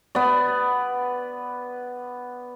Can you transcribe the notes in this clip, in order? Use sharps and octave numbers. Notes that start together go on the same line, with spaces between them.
B3 D5